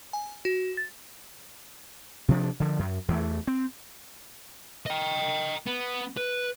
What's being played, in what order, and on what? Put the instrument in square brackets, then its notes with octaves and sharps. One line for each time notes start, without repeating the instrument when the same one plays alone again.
[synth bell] G#5
F#4
A6
[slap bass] C3 F3 D4
D3 F3
F#2
E2 E3 A3
C4
[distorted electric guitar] D#5 G5
B3
B4